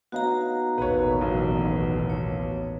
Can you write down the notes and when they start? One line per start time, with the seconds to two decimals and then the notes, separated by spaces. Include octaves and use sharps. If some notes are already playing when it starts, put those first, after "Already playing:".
0.12 B3 D#4 F#4 F5 A#5
0.78 A1 D#2 B2 B4 C#5
1.21 B1
2.10 C#5